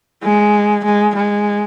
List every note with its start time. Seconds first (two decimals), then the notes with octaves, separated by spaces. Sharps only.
0.24 G#3
0.85 G#3
1.15 G#3